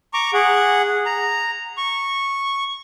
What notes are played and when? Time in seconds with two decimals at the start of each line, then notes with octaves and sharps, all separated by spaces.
0.13 A#5 C#6 D6
0.34 G#4 F#5
1.06 A#5
1.77 C#6